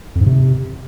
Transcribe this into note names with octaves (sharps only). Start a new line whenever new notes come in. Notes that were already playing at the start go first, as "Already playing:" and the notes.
F2
G#2
C3